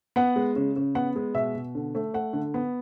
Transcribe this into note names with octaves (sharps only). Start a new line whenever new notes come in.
B3 F#5
G#3
C#3
C#3
B3 F#5
G#3
B2 E5
B2
D3
A3
A3 F#5
D3
B3